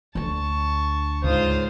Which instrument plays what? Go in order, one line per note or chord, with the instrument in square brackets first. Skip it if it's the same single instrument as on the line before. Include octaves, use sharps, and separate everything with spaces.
[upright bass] D2 D3 [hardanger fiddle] A5 C#6
[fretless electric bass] C#2 G#2 [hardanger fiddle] F4 D#6 [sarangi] C5